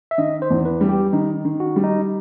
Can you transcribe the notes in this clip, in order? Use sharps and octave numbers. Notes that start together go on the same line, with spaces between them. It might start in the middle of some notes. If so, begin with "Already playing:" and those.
E5
D#3 D#5
C5
E2
B4
G3
G4
D#3 D#4
D#3
F#4
G3
D#4